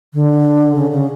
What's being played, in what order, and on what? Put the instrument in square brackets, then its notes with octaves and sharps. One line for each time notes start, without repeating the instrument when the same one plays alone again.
[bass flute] D3
C#3
C#3